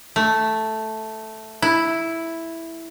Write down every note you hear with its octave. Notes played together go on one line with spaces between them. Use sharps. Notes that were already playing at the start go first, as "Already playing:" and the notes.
A3
E4